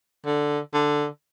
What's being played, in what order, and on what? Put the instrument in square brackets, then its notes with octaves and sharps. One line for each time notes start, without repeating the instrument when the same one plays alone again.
[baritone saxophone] D3
D3